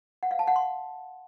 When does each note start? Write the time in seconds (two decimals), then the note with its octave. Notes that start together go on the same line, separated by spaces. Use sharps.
0.23 F#5
0.31 F5
0.39 A5
0.47 F#5
0.56 C6